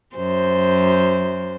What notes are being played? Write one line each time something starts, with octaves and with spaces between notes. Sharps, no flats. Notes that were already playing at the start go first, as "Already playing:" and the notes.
F#2 C5